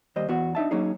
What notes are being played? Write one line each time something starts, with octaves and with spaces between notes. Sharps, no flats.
D#2 G3 C5 D#5
E2 B3 F#4
D4 D#4 E5 A5
F#3 A#3 C#4 D#4 G#4